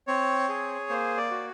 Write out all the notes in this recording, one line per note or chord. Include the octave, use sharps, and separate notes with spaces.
C4 C#5
G#4
A#3 C5
D5
F#4